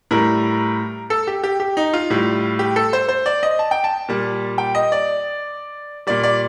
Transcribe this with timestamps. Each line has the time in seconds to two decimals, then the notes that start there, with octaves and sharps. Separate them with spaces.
0.11 A2 G3 A#4
1.10 A4
1.27 G4
1.44 G4
1.60 G4
1.77 D#4
1.94 F4
2.10 A2 G3
2.59 G4
2.76 A4
2.93 C5
3.08 C5
3.26 D5
3.43 D#5
3.59 A5
3.71 G5
3.84 A5
4.09 A#2 G3
4.58 G5
4.75 D#5
4.92 D5
6.07 A#2 G3 D5
6.23 D5